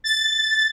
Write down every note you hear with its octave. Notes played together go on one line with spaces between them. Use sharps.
A6